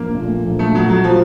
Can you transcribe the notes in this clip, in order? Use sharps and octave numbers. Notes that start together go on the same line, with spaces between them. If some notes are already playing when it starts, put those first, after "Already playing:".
Already playing: A#1 A#3
A#2 A3
A#1
A3
A#2 F#3 A3
F#3
F3